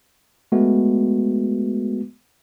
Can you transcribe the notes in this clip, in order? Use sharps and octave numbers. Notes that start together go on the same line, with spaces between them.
G#3 A3 B3 F#4